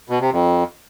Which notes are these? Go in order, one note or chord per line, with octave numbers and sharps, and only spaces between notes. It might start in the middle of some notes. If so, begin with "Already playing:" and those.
B2
C3
F2